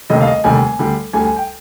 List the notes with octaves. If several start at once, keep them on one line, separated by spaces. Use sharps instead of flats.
F1 D#2 D3 G3 D#5
F5
D#5
F1 D#2 D3 G3 G#5
D2 D3 G3
D2 D3 G3 G#5
G#5
G5